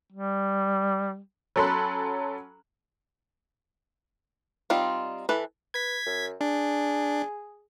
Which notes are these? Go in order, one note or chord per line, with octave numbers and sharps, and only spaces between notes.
G3
F#3 C#4 A4 B5 C6 F#6
G3 C4 D#4 F4
E3 A4 B4
B4 G#6 B6
F#2
D4 G#4